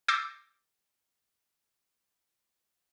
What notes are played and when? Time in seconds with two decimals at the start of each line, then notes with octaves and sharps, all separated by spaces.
0.08 D6 E6 G6 A6 A#6 C7